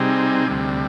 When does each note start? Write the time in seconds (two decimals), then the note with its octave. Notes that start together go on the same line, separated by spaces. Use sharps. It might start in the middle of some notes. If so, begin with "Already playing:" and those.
Already playing: C3 G3 C4 D#4 G#4
0.47 D2 C3 G3